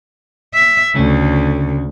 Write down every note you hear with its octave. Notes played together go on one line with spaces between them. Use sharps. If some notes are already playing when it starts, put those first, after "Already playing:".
E5
D2 C#3 A3 C#4